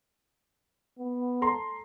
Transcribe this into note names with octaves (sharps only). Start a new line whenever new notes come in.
B3
A4 A#5 C6